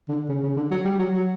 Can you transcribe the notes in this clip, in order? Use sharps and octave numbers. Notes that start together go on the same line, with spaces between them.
D3
C#3
C#3
D3
F#3
G3
F#3
F#3